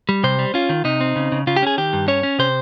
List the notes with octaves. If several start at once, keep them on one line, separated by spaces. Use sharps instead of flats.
G3
C3 C5
G3
C#4 F4
D#3
C3 D#4
C4
C#3
C#3
C#3 F4
G4
C#4 G#4
D#3 G4
G2
C#4 C#5
C#4
C3 C5